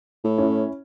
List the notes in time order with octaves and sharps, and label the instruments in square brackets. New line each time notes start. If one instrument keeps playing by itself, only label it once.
[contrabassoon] A2
[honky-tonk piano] C#4 E4